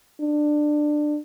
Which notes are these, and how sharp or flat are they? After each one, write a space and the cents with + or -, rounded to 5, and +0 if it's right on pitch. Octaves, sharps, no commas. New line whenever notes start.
D4 +20